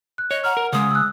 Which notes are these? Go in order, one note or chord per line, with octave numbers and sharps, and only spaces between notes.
F#6
C#5 D#5
F#5 A#5 F6
A#4
C#3 G#3 D#6
E6 F#6